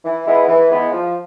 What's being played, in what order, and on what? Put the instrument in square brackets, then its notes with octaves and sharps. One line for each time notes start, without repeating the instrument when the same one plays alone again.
[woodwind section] E3
G#3 B3 E4
E3
G#3 B3 E4
F3